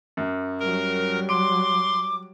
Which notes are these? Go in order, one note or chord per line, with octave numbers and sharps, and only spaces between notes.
F#2
F#3 G3 A#4
C6 D6 D7